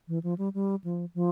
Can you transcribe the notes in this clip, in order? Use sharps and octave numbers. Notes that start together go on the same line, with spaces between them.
E3
F3
G3
G3
F3
F3